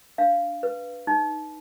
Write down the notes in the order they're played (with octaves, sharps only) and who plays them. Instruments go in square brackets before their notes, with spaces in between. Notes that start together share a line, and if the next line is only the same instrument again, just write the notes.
[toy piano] D4 F5
B4
D#4